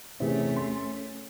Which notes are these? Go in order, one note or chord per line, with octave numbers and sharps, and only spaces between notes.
E2 C3 A3 C#4
C6